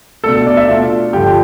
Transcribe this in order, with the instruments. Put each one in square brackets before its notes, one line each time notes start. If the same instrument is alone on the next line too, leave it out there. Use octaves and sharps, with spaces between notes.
[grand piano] B2 A3 D4 A4
D5
E5
B2 A3 D4 F4
G2 D3 F3 G4